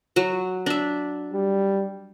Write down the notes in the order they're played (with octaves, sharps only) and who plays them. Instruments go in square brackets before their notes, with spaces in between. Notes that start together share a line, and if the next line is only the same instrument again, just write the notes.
[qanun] F#3 F#4
D4 E5
[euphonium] G3